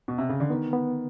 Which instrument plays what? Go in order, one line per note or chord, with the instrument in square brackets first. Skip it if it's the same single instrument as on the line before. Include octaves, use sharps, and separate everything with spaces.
[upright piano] B2
C3
C#3
D3
[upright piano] D#3 [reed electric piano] B3
[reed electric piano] B3